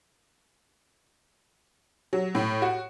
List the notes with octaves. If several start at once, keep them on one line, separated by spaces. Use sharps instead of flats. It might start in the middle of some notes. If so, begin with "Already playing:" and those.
F#3
A2
F#4